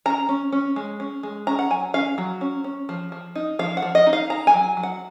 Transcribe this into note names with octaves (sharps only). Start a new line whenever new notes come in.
C#4 A#5
C#4
C#4
G#3
C#4
G#3
C#4 A#5
F#5
F#3 G#5
C#4 F5
F#3
C#4
C#4
F3
F3
D#4
F3 F5
F#5
F3
D#5
D#4
F5
D#4 A#5
G#5
F#3
F#3
F#5